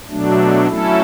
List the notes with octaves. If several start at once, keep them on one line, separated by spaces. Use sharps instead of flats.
B2 F#3 A3 D4
F#3 A3 C#4 E4 A4